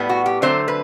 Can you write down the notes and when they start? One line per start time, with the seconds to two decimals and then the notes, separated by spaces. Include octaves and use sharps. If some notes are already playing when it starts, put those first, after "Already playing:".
Already playing: A2 G3 B3
0.09 F#4
0.26 G4
0.42 D3 F#3 A3 C4 C5
0.68 B4